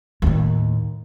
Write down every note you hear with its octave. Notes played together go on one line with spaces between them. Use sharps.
D#2 A2